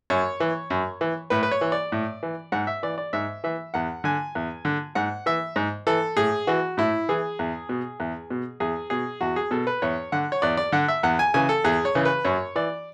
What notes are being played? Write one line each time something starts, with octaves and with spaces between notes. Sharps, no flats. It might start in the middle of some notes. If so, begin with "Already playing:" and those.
F#2 C#5
E3
F#2
E3
A2 B4
B4
C#5
E3
D5
A2
E3
G#2 F#5
E5
E3 D5
D5
G#2 E5
E3 E5
E2 F#5
D3 G#5
E2
D3
G#2 F#5
E3 E5
G#2
E3 A4
A2 G#4
E3 F#4
A2 E4
E3 G#4
E2
B2
E2
B2
E2 G#4
B2 G#4
E2 F#4
G#4
B2 A4
B4
E2 C#5
D3 F#5
C#5
E2 D5
D5
D3 F#5
E5
E2 F#5
G#5
C#3 E3 G#5
A4
E2 G#4
C#5
C#3 E3
B4
F#2 C#5
E3 D5